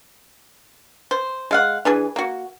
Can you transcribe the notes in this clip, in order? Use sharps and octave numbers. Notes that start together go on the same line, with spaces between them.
C5
G#3 F5 F#5
E3 D4 G#4
A#3 F#4